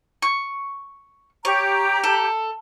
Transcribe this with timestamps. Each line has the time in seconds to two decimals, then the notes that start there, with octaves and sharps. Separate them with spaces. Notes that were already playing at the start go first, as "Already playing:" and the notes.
0.22 C#6
1.45 G4 C#5 A#5
2.04 A4